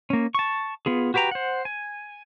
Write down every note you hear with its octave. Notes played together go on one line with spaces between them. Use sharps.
A#3 C#4
A5 C#6
B3 F4 G#4
F#4 G4 B4 G5 A#5
C5 F#5
G#5